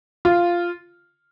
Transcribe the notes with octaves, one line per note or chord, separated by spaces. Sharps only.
F4